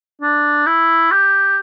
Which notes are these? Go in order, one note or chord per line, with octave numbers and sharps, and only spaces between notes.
D4
E4
G4